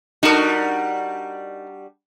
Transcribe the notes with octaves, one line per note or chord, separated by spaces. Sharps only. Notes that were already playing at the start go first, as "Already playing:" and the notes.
G3 D4 D#4 F#4 A#4